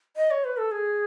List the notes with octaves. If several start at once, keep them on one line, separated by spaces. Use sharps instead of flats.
D#5
C#5
B4
A4
G#4